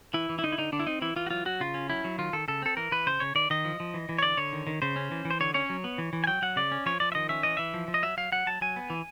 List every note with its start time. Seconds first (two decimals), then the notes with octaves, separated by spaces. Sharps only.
0.14 E3 E4
0.29 E3
0.39 E4
0.43 D3 D#4
0.52 E4
0.58 D3 D#4
0.72 D3 D4
0.80 E4
0.87 C4 D#4
1.02 E3 E4
1.16 E3 F4
1.26 F#4
1.31 F#3 F4
1.46 F#3 F#4
1.60 C#3 F4
1.74 C#4
1.90 F#3 E4
2.04 F#3
2.18 D#3 F4
2.33 D#3 A4
2.48 C#3 A4
2.62 C4 A4
2.77 E3 A#4
2.92 E3 B4
3.07 C#3 C5
3.20 C#3 C#5
3.35 D#3 D5
3.50 D#3 D#5
3.65 F3
3.80 F3
3.94 E3
4.09 E3
4.19 C#5
4.23 D3 D5
4.37 D3 C#5
4.53 D#3
4.67 D#3
4.82 C#3 C5
4.96 C#4
5.11 E3
5.25 E3
5.31 C5
5.40 D3 C#5
5.54 C#4 C#5
5.70 F#3
5.84 B3
5.98 E3
6.13 E3
6.24 G#5
6.27 F#3 G5
6.42 F#3 F#5
6.56 C#3 D5
6.71 C#4
6.86 F3 C#5
7.00 F3 D5
7.12 E5
7.15 D#3 D#5
7.29 C#4 E5
7.43 E3 D#5
7.57 E3 E5
7.74 F3
7.88 F3
7.94 D#5
8.03 F#3 E5
8.17 F#3 F5
8.32 F#3 F#5
8.47 F#3 A5
8.61 F#3 G#5
8.76 B3
8.90 E3